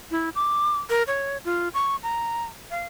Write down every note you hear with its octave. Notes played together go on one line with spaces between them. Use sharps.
E4
D6
A#4
C#5
F4
C#6
A#5
F5